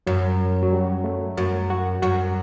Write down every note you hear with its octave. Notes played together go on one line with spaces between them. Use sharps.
F#2 F#3
F#3
G3
A3
F#2 F#4
F#4
F#2 F#4